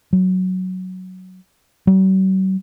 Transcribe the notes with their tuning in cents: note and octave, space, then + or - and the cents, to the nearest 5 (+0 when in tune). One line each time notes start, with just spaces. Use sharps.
F#3 +0
F#3 +45